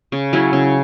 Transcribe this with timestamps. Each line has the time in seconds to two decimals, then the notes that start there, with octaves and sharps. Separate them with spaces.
0.12 C#3
0.33 F#3 C#4 E4
0.53 C#3